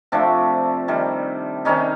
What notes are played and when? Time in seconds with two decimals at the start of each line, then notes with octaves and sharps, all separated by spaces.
0.12 C3 F3 A3 C4 D4
0.88 C3 D#3 G3
1.65 C3 D#3 G3 C#4 D#4